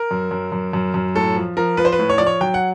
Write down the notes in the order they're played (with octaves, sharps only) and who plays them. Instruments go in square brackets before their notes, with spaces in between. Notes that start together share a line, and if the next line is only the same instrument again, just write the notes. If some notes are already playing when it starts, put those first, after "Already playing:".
Already playing: [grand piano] A#4
F#2
F#2
F#2
F#2
F#2
A2 A4
F3
F3 A#4
F3 B4
C5
B4
A2
C#5
F3 D5
C#5
F#3 G5
F#5